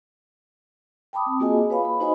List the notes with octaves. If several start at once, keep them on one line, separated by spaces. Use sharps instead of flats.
G5 A5 B5 D6 D#6
C4
A#3 F4 F#4 G#4 D#5 G#5
B4 C#5 F5 B5
B5
D#4 F#4 C5 D#5 G#5 B5